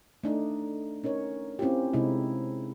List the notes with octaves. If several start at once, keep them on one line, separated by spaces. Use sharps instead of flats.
A3 D4 D#4
C#4 D#4 A#4 C#5
C4 C#4 E4 F4 G4
C3 G#3 C4 D#4 E4